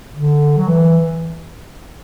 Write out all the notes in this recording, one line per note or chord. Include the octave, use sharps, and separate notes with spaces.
D3
F#3
E3